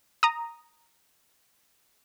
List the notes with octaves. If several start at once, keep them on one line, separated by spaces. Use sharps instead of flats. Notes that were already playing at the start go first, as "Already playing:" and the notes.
A#5 D#6